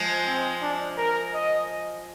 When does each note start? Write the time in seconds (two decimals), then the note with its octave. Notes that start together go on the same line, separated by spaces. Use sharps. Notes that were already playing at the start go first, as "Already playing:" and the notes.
Already playing: F3 G#3
0.26 C4
0.62 D4
0.98 A#4
1.34 D#5